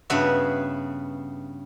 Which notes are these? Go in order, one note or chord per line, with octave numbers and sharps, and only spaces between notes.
G2 C#3 B3 F#4 E5